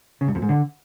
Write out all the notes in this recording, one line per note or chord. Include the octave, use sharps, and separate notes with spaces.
C#3
G2
F2
G#2
D3